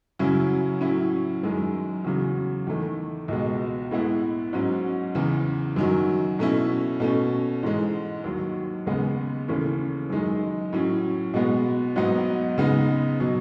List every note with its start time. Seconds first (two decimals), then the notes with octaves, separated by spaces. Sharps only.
0.19 F#2 C#3 F#3 C#4 E4
0.81 A2 F#3 C#4 E4
1.43 F#2 D#3 G#3
2.05 E2 C#3 F#3
2.67 E2 D#3 A3 E4
3.28 C#2 B2 G#3
3.91 A2 G#3 B3 E4
4.53 G#2 F#3 C#4
5.15 E2 C#3 E3
5.76 F#2 D#3 F#3
6.39 B2 A3 C#4 E4
7.00 B2 A3 C#4
7.63 G#2 E3 G#3
8.24 D#2 D#3 F#3
8.87 D#2 C#3 G#3 B3
9.48 D#2 C#3 E3 A3 C#4
10.09 F#2 D#3 G#3 D#4
10.72 A2 F#3 C#4
11.34 B2 G#3 B3
11.96 G#2 F#3 B3 D#4
12.58 C#3 G#3 B3 D#4
13.20 B2 F#3